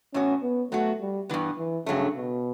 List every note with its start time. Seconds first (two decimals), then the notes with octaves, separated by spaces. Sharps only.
0.14 A2 E3 B3 C#4 F#4
0.43 B3
0.71 F#3 A3 B3 F#4
1.00 G3
1.29 G2 E3 B3
1.58 E3
1.86 G2 C#3 F#3 A3
2.16 B2